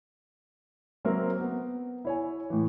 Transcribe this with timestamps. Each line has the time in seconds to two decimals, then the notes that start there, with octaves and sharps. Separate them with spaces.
1.05 F#3 A#3 C4 A#4 C5 E5
1.41 B3
2.05 E4 C#5 G#5
2.50 A2 E3